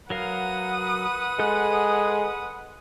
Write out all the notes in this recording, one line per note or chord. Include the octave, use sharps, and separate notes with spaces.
F#3 A#4 B4 F5 F#5 D#6
G#3 A4 F#6